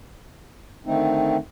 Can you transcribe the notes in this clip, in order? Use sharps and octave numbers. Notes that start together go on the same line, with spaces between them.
D3 D#3 A3 C4 D#4